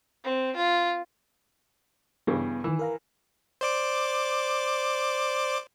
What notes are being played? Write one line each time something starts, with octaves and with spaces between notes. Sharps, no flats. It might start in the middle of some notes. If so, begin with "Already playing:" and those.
C4
F4
G2 C#3 E3 B3
D#3 E3 E6
A#4 F5 A#5
C5 D5 D6